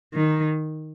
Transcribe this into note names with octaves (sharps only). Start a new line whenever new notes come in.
D#3